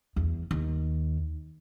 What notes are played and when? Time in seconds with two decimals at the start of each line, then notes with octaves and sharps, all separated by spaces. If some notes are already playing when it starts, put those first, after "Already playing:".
0.16 E2
0.51 D#2